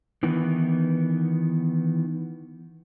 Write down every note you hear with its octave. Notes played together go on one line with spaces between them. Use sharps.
D#3 E3 B3